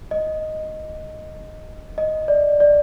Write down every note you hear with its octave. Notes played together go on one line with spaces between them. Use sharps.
D#5
D#5
D5
D5